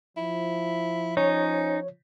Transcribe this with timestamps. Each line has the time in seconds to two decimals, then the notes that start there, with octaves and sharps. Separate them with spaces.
0.17 F3 E4
1.17 C#4 D#4 C#5